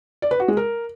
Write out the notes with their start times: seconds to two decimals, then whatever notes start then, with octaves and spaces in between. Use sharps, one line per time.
0.22 D5
0.31 B4
0.40 F#4
0.48 G#3
0.57 A#4